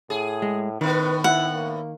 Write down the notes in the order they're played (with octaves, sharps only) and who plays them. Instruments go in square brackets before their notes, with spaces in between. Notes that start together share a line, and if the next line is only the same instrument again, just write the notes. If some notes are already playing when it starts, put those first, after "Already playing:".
[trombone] A2 [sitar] G#4
[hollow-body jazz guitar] G#3
[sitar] A2 B3 [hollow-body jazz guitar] D#3 [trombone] B4
[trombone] E4 [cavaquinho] F#5
[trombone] A#3